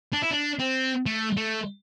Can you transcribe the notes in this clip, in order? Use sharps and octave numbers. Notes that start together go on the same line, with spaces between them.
D4
E4
D4
C4
A3
A3